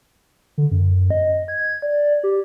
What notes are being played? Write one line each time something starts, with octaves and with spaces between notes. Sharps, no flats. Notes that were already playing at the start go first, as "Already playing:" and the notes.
D3
F#2
D#5
G#6
D5
G4